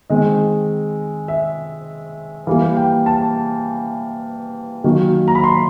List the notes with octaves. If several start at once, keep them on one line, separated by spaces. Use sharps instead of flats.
D#3 G#3 C4 D#5
E5
E3 G3 A#3 F5
G5
A5
D#3 F#3 A#3
A#5
B5
C6